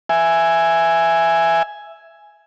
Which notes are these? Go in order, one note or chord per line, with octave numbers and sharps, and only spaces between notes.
E5 G#5